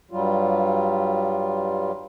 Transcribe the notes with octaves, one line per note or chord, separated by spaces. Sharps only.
G2 F#3 G3 F4